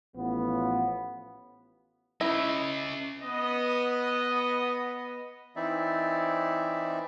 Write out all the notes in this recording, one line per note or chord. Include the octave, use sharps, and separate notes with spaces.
A1 A2 F3 B3
C#4 E4 D#5
B3 D#5
E3 C4 D#4 E4 D5 E5